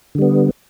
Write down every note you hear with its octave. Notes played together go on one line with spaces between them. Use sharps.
D3 G3 B3